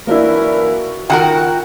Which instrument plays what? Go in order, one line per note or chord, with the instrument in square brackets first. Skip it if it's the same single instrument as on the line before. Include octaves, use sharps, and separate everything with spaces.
[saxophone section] F#2 E3 A#4 [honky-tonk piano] A#3 D4 E4 [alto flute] F#4
[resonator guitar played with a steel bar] D#3 F#4 A#4 [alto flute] F4 [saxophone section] F#5 [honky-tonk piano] G5